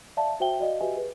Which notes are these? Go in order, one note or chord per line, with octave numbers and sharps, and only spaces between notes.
D5 E5 F5 A5
F#4 C5 E5 G5 G7
F#4 D5 D#5 F5
F#4 G4 B4 D#5 E5 G#5
G#4 B4